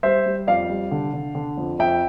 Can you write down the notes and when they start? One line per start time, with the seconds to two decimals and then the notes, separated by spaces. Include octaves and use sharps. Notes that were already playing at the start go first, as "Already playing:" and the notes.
0.03 G3 C5 E5
0.26 G3
0.47 F2 D5 F5
0.70 G3
0.91 D3
1.13 D3
1.35 D3
1.57 F2
1.79 F2 E5 G5